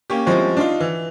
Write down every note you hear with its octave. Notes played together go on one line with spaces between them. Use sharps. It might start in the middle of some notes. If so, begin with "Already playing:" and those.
A#3 C#4 G4
F3 G3 G#3 C4 C#4 E4
D4 D#4 F4
E3